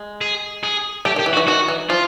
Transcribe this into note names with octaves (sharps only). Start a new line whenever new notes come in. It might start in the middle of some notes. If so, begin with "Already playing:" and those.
Already playing: G#3
G#4
G#4
A3 G4
D#3
G4
E3
F#4
E3
D#3 F#4
E3
F3 F4